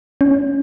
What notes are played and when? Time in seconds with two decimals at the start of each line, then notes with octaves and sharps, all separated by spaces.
0.21 C#4